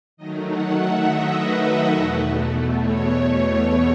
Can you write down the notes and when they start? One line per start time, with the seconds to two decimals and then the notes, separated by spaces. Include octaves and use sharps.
0.17 D#3 F#3 A3 D#4 D#5
0.46 F#5
0.75 E5
1.05 D#5
1.34 B4
1.63 B4
1.92 E2 B2 A3
2.80 C#5